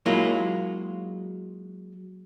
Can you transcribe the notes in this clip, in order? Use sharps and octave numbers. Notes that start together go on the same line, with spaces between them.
F#3 G#3 A#3 E4 F4